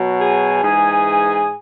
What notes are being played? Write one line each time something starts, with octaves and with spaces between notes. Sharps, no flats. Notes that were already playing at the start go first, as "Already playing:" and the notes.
Already playing: B2 F#3
G#4 G#5
G#2 E3 G#4 G#5